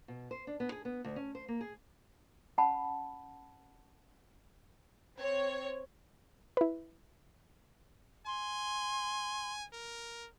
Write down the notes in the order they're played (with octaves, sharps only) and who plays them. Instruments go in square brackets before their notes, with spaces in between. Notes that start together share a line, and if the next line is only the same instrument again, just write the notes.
[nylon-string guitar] B2
C5
D4
B3
G#4
B3
D2
C#4
C5
A#3
G#4
[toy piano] C#4 F#5 A5 B5
[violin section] C4 C#5
[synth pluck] E4 B4
[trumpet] G#5 [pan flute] C6
[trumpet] A#4